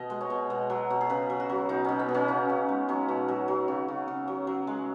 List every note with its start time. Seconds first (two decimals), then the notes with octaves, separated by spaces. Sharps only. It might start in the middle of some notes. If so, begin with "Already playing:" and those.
Already playing: B2 D#5
0.10 G#3
0.21 C#5
0.30 B2
0.50 B2
0.70 F#3
0.90 B2
1.01 G#4
1.10 C#3 B4
1.30 F#3
1.40 F#4
1.50 F#3
1.69 B2 D#4
1.85 B2 C#4
1.99 B3
2.09 B2
2.14 C#4
2.28 C#3 D#4
2.49 C#3
2.69 G#3
2.88 F#3 C#4
3.09 B2
3.28 F#3
3.48 F#3
3.68 C#3
3.88 C#3
4.08 C#3
4.28 F#3
4.47 F#3
4.67 G#3